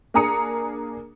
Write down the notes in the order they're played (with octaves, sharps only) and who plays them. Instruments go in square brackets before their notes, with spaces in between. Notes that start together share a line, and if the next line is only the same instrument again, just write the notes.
[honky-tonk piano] A#3 D4 G#4 A#5 D#6 C#7